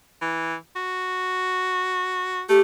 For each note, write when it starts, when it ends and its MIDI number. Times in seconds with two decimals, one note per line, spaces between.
0.21 0.55 52
0.76 2.43 66
2.49 2.61 57
2.49 2.61 67